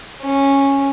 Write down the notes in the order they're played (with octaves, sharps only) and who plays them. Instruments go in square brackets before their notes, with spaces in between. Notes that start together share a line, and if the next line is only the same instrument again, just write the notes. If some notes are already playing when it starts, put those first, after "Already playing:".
[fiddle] C#4